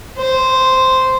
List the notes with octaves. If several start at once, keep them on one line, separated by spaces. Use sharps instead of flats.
C5